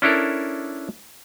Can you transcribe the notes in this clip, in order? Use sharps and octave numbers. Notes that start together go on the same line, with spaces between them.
C#4 D4 E4 A4 A#4